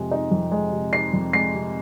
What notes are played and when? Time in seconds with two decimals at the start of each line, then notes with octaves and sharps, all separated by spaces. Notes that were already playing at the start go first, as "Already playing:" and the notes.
Already playing: F2 C3 G#3
0.11 D#4
0.31 F2
0.52 G#3
0.72 C3
0.93 D#4 C7
1.13 F2
1.33 G#3 C7
1.54 C3